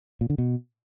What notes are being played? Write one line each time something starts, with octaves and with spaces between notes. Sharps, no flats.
A#2
D3
B2